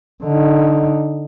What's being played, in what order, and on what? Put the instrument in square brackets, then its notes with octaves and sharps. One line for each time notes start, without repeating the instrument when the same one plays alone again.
[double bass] D3 D#4